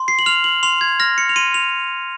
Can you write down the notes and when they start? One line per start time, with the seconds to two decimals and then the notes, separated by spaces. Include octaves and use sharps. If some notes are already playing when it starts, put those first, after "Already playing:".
Already playing: C6
0.08 C7
0.19 F#7
0.26 F6 F7
0.44 F#7
0.63 C6 F7
0.81 G#6
1.00 F6 A#6
1.18 C#7
1.29 F7
1.36 C6 D#7
1.54 F7